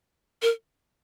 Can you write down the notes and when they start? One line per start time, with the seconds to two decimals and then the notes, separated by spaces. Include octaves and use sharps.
0.42 A#4